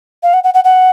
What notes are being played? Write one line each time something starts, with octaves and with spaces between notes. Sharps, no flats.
F5
F#5
F#5
F#5
F#5